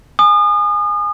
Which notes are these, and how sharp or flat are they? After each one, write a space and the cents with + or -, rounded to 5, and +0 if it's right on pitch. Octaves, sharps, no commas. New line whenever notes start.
G#5 +0 D#6 -35